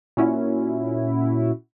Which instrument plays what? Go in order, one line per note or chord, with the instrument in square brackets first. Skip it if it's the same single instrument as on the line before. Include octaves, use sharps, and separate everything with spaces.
[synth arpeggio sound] A#2 C#4 E4 F#4